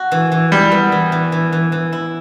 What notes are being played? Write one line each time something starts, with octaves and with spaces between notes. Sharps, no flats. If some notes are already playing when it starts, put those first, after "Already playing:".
Already playing: F#4
E3
E3
G3 E4
B3
E3
E3
E3
E3
E3
E4